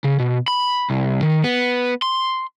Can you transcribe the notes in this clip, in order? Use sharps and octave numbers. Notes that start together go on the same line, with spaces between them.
C#3
B2
B5
C2
D#3
B3
C6